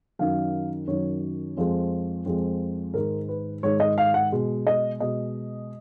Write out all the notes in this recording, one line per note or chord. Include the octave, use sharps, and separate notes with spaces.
F#2 D#3 F#3 F5
F#2 D#3 F#3 C#5
F2 F3 G#3
F2 F3 G#3
G#2 D#3 G#3 A#4
B4
G#2 D#3 G#3 C#5
D#5
F5
F#5
B2 G#3
D#5
B2 G#3 D#5